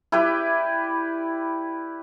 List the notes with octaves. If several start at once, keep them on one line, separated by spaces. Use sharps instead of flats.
E4 G4 B4 D5